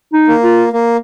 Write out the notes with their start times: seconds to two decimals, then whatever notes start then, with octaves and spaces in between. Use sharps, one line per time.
0.13 D#4
0.28 A#3
0.43 F4
0.73 A#3